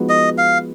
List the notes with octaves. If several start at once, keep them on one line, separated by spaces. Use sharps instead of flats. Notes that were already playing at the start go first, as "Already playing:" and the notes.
Already playing: F3 G#3 B3 D#4 F#4
D#5
F5